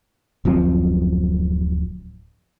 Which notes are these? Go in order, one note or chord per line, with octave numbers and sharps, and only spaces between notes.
D1 F#2 F3 C4